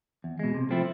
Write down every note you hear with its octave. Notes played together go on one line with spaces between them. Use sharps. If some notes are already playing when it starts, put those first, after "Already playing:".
E2
B2 G#3
C3
F3 A3 C4 E4